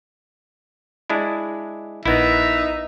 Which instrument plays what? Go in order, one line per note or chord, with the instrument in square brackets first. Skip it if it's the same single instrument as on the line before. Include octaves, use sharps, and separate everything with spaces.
[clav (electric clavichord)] G#3 D4 E4
[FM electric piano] A#1 F#6 A#6 [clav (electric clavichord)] B3 E4 [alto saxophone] D#4 [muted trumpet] E5